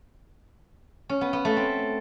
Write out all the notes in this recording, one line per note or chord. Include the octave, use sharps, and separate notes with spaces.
C#4
B3
B3
A3
C4